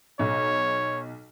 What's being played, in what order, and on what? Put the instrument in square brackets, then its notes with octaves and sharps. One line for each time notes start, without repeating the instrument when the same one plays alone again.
[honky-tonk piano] B1 [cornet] C#5